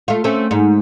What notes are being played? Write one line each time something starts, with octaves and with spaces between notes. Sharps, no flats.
A3 F4
A3 C4 C#4
G#2